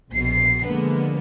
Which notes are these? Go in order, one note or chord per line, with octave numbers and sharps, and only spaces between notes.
A#1 B2 C7
D3 F3 G#3 A#3 B3